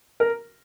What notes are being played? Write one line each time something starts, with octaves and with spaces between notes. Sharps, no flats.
A#4